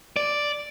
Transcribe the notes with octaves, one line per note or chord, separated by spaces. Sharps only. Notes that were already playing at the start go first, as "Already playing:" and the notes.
D5